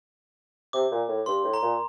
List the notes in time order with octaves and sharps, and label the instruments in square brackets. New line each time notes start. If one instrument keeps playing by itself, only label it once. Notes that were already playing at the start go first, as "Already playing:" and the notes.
[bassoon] C3 [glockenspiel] D6
[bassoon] A#2
A2
[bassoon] G2 [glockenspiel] C6
[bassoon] A2
[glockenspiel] A#5
[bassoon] A#2